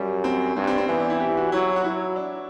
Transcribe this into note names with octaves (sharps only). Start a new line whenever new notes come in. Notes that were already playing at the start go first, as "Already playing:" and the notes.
Already playing: F#2 G3
C4
G2 C4
C4
C4
E3 B3
D4
E4
G4
F#4
F#3 E4
F#4
F#3 E4
D4